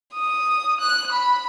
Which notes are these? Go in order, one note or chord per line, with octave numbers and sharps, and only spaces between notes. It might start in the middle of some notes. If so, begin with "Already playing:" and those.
D#6
F#6
B5